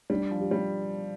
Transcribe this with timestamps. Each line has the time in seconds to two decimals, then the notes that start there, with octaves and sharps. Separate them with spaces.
0.10 G3 D4
0.31 F3
0.41 G4
0.51 G3